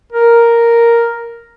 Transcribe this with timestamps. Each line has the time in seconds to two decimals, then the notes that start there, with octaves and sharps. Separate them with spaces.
0.12 A#4